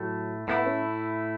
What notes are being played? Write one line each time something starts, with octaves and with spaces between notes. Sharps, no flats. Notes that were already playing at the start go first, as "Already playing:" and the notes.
Already playing: A2 F#3 A3
A2 A3 B3 E4
C#4